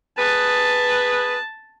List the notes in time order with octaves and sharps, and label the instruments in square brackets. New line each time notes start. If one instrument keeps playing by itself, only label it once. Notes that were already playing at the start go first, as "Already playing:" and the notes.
[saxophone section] G#4 B4 [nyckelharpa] A5